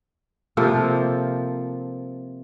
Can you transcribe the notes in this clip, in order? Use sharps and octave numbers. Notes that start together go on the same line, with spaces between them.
C3 F3 A#3 A4